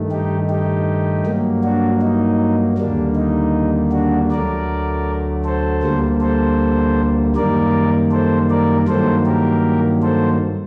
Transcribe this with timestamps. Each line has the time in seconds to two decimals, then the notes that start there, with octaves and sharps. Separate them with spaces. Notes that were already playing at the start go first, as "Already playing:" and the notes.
Already playing: G2 D#3 A3
0.11 D#4 G4
0.50 D#4 G4
1.26 G2 F#3 A#3
1.64 D4 F#4
2.02 D#4
2.78 D#2 D3 G3 A#3 D4
3.16 D#4
3.92 D4 F#4
4.31 D2 D3 F#3 A3 A#4 D5
5.45 A4 C5
5.83 D2 D3 G3 A#3
6.21 A4 C5
7.36 F#2 D#3 G3 A#3 A#4 D5
8.11 A4 C5
8.50 A#4 D5
8.88 G2 D#3 F#3 A#3 A4 C5
9.26 G4 A#4
10.03 A4 C5